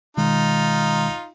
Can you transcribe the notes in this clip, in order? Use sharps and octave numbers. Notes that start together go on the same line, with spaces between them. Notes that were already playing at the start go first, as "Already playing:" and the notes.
B2 D#3 G#3 D#4 F4